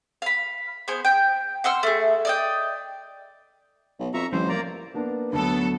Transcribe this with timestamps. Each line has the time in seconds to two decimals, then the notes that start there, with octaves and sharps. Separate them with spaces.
0.22 F5 B5
0.88 B3 G#4 C5
1.05 G5
1.64 F#5 C6 E6 F6
1.83 A3 G#4
2.25 D5 D#5 G5
3.99 B1
4.14 F2 E5 A#5 C#6
4.33 A1 F3 G3 C5
4.49 A#3 D5 A#5
4.94 A#3 B3 D4
5.33 D2 F#3 B3 A4